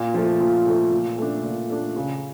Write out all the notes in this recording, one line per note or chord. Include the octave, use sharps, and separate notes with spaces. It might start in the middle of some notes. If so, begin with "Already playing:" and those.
Already playing: A#2
F3 A3
A#2
F3 A3
A#2
A3 D4
A#2
A3 D4
C#3